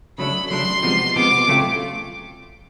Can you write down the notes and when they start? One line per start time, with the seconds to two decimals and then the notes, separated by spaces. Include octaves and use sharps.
0.18 C#3 F#3 A3 D4 B5
0.50 C#3 F#3 A3 D4 C6
0.83 C3 F3 G#3 B3
1.16 C3 F3 G#3 B3 D6
1.47 C#3 F#3 A3 C4 F4